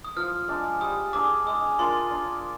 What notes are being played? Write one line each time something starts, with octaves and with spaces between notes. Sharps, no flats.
D#6
F3 F6
G#3 D4
G3 D#6
D4 G#4 D6
G#3 D#6
D4 F4 A#4 C6
D4